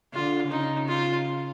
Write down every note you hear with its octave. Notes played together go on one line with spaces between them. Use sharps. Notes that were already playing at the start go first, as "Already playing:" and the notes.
D3 F4
C#3 D#4
F4